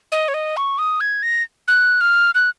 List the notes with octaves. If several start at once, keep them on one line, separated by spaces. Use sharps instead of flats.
D#5
C#5
D#5
C#6
D#6
G#6
A#6
F#6
F6
F#6